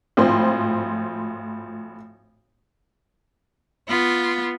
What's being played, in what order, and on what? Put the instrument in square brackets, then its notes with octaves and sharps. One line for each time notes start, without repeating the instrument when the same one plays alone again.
[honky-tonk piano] G#1 A2 F3 C5 G5
[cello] B3 F4